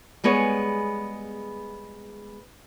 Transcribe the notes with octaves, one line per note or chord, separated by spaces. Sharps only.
G3 G#3 B3 G#4 C#5